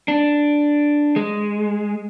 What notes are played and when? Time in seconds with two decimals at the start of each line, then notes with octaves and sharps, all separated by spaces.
0.08 D4
1.16 G#3